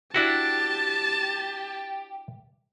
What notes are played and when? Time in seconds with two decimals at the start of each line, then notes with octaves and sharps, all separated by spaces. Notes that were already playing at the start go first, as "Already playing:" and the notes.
0.14 D4 E4 F#4 G4 A5